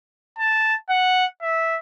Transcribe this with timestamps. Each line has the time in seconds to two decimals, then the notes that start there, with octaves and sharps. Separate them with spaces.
0.39 A5
0.90 F#5
1.42 E5